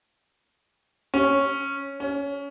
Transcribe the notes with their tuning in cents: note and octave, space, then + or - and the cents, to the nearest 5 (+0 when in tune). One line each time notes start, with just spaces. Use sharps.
C#4 -5
C#4 +20